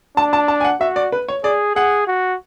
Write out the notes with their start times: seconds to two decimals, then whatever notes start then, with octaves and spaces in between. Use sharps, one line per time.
0.17 D4 A5
0.33 A5
0.48 A5
0.60 G#5
0.64 F#5
0.80 F#4 E5
0.96 D5
1.12 B4
1.28 C#5
1.44 G#4 D5
1.76 G#4 F#5
2.08 F#4